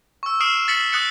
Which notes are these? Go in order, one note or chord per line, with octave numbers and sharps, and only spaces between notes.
C#6 E6
D#6 F6 C7 D7 E7
A6 B6 C#7 F#7
D#6 F#6 A6 C#7